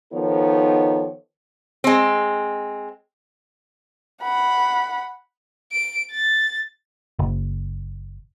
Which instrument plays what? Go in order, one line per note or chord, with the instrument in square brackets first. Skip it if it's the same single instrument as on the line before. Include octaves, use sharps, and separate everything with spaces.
[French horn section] D#3 F3 B3 D#4 A4 C#5
[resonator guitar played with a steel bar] G#3 C4
[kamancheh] F#5 B5
[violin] D7
A6
[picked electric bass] F#1